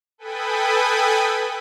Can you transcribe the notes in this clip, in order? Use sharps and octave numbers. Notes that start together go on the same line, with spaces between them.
A4 B4 G5 G#5 B5 D#6